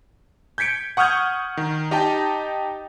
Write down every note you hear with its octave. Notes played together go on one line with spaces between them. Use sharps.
G6 G#6 B6 C#7 D7
F#5 C#6 D#6 F6 G6 G#6
D#3
D#4 G4 D#5 G5 A5